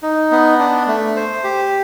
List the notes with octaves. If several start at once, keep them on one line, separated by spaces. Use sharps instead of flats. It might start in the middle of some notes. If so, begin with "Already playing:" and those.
D#4
B3
D4
A3
C5
G4